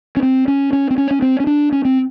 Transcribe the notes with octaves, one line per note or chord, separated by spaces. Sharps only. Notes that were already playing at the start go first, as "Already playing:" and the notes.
C#4
C4
C#4
C#4
C4
C#4
C#4
C4
C#4
D4
C#4
C4